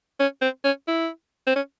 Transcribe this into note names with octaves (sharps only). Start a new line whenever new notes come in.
C#4
C4
C#4
E4
C4
C#4